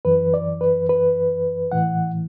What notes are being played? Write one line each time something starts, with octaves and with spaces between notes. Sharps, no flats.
F#2 E3 B4
D5
B4
B4
A2 E3 F#5